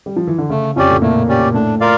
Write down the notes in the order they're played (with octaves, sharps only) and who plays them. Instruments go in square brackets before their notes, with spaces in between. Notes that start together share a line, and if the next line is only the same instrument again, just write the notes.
[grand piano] G3
F3
E3
D3
[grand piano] C#3 [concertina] A3
[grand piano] F2 F3 [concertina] C#4 G4 D5
[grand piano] A2 A3
[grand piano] A#2 A#3 [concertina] A3
[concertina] C#4 G4 D5
[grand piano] A2 A3 [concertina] D4
[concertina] F4 A#4 D5 F5